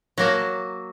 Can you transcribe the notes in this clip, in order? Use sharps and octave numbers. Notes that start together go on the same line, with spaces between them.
F#3 A#3 A5